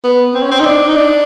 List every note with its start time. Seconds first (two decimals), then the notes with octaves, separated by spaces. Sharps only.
0.04 B3
0.34 C4
0.43 C#4
0.51 C4
0.60 D#4
0.65 D4
0.88 D#4
0.96 D4